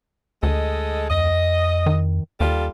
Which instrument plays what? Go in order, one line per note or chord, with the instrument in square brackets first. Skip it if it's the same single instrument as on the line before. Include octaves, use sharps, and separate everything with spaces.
[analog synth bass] D2 [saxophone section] G#3 A4 D#5
[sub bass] F2 [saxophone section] D#5
[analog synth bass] D#3
[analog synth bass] D#2 [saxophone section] G3 F4 A4